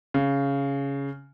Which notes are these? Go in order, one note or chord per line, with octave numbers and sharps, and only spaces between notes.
C#3